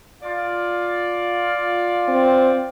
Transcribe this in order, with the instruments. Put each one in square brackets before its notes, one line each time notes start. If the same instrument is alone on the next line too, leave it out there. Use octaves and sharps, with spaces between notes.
[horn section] F4 D5
[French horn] C4